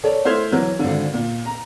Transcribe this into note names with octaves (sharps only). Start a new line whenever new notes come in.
A4 A#4 C#5 D5
A3 E4 C5 C6 F6 G#6
E3 F#3
G#1 D3
A#2
A#5